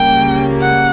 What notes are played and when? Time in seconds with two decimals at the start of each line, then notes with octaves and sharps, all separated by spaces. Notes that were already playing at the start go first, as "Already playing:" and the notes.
Already playing: C#2 C#3 G3 A#3 G5
0.61 F#5